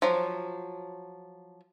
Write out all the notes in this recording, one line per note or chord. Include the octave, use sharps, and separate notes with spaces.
F3 F#3